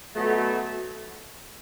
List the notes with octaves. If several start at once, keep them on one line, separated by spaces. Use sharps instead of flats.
B2 F#3 A3